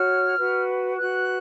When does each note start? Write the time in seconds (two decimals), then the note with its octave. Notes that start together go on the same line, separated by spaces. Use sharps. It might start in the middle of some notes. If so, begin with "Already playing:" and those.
Already playing: F#4 C#5 F6
0.37 F#4 B4
0.96 F#4 B4 F#6